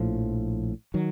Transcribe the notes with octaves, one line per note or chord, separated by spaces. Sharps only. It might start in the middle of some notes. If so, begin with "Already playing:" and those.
Already playing: A#1 A2 F3
D#3 F#3